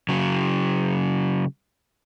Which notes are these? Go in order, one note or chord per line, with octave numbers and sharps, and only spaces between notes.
C#3 F#3